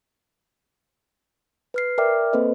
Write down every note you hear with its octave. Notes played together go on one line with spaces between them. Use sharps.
B4 F6 C7
A#4 D5 E5 G5 D6 F6
A#3 C4 A4 B4 C5 D#5